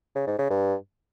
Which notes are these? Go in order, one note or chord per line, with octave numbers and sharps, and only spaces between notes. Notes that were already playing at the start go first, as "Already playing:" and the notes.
C#3
G#2
C#3
G2